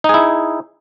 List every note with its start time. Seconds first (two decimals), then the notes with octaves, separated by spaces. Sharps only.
0.04 D#4
0.09 G#4
0.14 E4